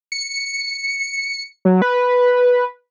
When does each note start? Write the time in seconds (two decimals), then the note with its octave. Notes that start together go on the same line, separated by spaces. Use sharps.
0.12 C#7
1.65 F#3
1.82 B4